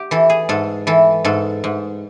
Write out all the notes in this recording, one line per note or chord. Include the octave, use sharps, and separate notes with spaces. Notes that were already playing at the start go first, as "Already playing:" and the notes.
Already playing: G4
E3 A4
G#4
G#2 A4
E3 A4
G#2 A4
G#2